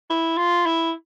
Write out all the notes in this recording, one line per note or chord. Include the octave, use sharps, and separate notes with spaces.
E4
F4
E4